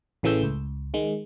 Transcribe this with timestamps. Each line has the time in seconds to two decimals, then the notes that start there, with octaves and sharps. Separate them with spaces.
0.23 A1 C#3 E3 A3 E6 G6
0.43 C#2
0.94 D#3 G#3